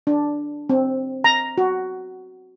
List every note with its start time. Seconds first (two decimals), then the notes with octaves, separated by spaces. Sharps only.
0.07 D4
0.69 C4
1.24 A#5
1.58 F#4